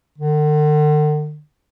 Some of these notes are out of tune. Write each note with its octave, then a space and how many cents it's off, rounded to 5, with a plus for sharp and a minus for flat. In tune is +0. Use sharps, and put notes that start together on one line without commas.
D3 +45